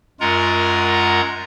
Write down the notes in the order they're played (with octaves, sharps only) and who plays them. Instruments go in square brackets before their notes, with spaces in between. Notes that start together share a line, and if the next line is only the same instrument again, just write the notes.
[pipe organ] F#2 G#3 F4 A#4 F#5 A#5